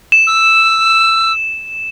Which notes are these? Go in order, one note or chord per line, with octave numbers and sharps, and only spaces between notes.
E7
E6